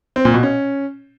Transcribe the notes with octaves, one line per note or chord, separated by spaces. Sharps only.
C4
A#2
B2
C#4